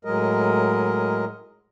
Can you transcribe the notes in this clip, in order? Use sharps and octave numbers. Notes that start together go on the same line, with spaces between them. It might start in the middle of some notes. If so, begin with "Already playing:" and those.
A2 F#3 G#3 A#4 D#5